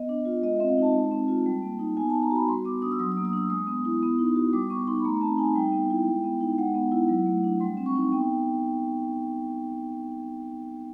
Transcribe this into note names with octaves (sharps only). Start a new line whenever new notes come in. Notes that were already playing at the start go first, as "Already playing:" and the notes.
Already playing: B3 D#5
D4
F4
G#3 D#5
C4 E5
F5
D#4 A5
G#3
C4
F4
G3
A#3
D#4
B3 G#5
D#4 A5
A#5
F#4 B5
G3 C6
B3 D6
D4 D#6
E6
F#3 D#6
D#6
A#3
D#6
D4 E6
G#3 D#6
B3
E4
B3
D#4
F#4
G3 D6
B3 C#6
D#4 C6
B5
A3 A#5
C4 A5
D#4 G#5
G3 G5
B3
E4
G#3
B3
D#4
G#3 F#5
B3
E4
F#3
A3
D4
G3 C6
C4
C#6
D#4
B3 G5